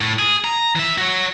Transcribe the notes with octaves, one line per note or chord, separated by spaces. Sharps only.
A2
G#4
A#5
E3 E5
F#4 C#5